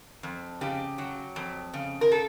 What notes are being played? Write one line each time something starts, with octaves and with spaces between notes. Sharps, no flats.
F2
C#3 G4
F#3
F2
C#3
A#4
A4